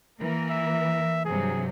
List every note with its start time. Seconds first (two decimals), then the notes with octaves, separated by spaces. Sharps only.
0.19 E3 A#3 A#4
0.50 E5
1.25 G2 C3 F#3 G#4